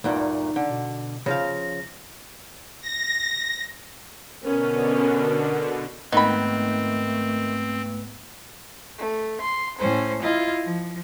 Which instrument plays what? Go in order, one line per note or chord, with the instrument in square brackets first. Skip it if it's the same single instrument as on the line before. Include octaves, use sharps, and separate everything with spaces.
[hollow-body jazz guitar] D2 G2 A#2 [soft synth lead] D#4
[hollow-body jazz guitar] D3
[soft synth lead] B2
[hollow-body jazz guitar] C#3 F3 F5 [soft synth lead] A#6
[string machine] A#6
[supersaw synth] B2 D3 [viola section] B3 C#4 [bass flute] A#4
[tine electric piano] G#2 B3 B4 [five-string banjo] D#3 B5 [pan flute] A3 [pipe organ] C4
[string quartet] A3
C6
A2 C#4 C5
E4 F4 D#5
F3